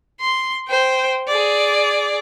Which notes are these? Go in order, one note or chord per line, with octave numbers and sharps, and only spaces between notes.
C6
C5 G5
G#4 D5